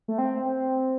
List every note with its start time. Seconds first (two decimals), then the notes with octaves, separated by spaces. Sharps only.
0.08 A3
0.18 C4
0.46 C4